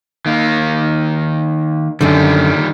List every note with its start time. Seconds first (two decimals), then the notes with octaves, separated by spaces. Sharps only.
0.26 D#3 A#3
2.01 F#2 D3 D#3 G3